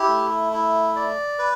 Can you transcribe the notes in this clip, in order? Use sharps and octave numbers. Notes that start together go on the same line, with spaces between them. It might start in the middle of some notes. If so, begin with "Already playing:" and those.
Already playing: E4 G4
A3
E4
D5
B4